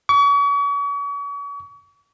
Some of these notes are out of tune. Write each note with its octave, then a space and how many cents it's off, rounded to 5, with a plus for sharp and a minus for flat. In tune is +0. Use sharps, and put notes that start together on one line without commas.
C#6 +40